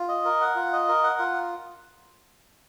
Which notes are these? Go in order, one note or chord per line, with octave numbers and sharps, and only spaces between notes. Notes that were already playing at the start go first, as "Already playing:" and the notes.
Already playing: F4
D#5
A#4
F#5
F4
D#5
A#4
F#5
F4